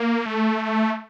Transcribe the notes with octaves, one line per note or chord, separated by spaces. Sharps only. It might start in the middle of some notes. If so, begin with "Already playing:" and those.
Already playing: A#3
A3